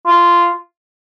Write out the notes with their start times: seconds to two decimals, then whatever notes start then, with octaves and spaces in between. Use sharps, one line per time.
0.07 F4